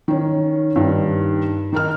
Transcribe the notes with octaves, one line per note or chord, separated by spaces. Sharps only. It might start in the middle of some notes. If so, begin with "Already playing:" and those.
D#3 C#4
G2 D#3
D#3 D#4 A#4 D#5 F6